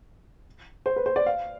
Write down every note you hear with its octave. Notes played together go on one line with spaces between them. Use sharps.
C5
B4
C5
D5
F5